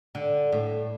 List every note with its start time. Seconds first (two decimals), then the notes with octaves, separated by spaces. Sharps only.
0.15 D3
0.52 A2